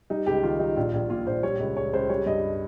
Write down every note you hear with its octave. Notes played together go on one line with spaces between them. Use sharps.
G3 D#4
C#2 G4
D#3 F4
G3 D#4
A#1 F4
A#1
A#2 F4
A#1 C5
G3 C#5
C#2
C#2 C#5
C#2 C5
G3 C#5
G2 D#5